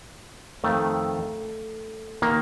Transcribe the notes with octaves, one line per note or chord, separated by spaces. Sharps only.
F2 D#3 A3
D#3 A#3